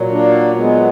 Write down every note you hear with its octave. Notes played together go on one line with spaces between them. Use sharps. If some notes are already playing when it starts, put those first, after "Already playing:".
Already playing: A#2 F#3
A#3 D4
G#3 B3